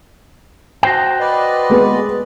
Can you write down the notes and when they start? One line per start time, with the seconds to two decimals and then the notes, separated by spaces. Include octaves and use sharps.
0.83 F#4 C5 G5
1.20 B4 D5 D#5
1.70 G#3 B3 G#4